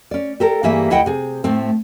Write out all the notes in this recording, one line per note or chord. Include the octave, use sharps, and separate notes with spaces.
C#4 D5
G4 A4 A#4
G2 E3 G3 A#3 G#4 E5
D2 E4 D#5 F#5 G5
C3 G#4
A2 A3 C4